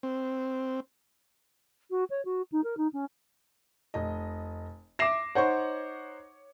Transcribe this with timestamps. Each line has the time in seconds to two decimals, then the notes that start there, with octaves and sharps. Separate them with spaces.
0.03 C4
1.90 F#4
2.10 C#5
2.25 F#4
2.52 D#4
2.64 A#4
2.77 D#4
2.93 C#4
3.94 F1 D#5
4.99 E5 D6 A#6 C7 E7
5.35 D#4 C5 C#5 F#5 C#6